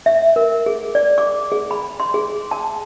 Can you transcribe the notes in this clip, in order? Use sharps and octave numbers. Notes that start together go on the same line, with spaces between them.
E5
A#4
G#4
D5
D6
G#4
B5
C6
G#4
A5